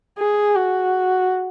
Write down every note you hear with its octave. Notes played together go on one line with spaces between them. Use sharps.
G#4
F#4